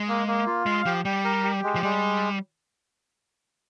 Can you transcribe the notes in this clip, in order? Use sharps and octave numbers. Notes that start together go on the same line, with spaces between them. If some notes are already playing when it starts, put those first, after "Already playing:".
Already playing: G#3
A#3
A#3
F4
G#3 F5
F3 G4
G3 G4
A#4
G4
G#3
F3
G3 G#3